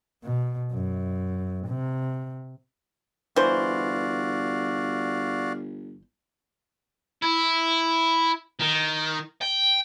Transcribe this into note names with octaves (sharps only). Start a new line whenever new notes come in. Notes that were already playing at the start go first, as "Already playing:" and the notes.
B2
F#2
C3
G1 E3 F#4 C5 D5 F5
E4
D#3
G5